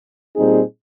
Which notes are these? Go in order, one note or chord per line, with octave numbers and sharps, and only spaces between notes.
A#2 G3 C4 D#4 G#4